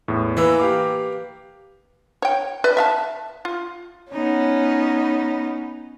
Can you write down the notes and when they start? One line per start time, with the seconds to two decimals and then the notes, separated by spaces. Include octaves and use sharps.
0.08 E2 A2
0.37 E3 A#3 B4 E6
0.59 G4 F5 D6
2.22 C#5 G5
2.64 B4 D5 E5
2.77 E5 F5 A5
3.45 F4
4.13 B3 C#4 D#4